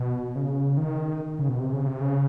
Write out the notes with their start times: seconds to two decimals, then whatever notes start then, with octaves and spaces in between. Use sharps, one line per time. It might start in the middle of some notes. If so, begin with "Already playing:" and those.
Already playing: B2
0.36 C#3
0.77 D#3
1.39 C#3
1.49 B2
1.60 C3
1.73 C#3
1.87 C3
2.01 C#3